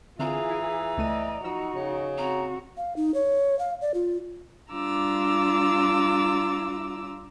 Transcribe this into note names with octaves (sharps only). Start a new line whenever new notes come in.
D3 E3 C4 F4 G#4 F5 A#5
E4
C#2 A3 D5 D#5 D#7
F3 D#4 F#4 D#5 E6
C#3
C4 F#4 A#5
F5
D#4
C#5
F5
D5
F4
G3 D4 F4 A#5 D6 E6